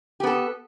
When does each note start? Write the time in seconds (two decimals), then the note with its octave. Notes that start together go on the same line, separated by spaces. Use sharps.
0.20 G4
0.23 B3
0.27 A4